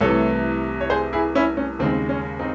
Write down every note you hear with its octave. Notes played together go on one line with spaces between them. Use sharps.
C2 C3 E3 A3 A4 C#5
C#5
G#4 C5
E4 G#4
C#4 E4
C#4
D#2 C#3 G#3 C4
C#4
C4 D#4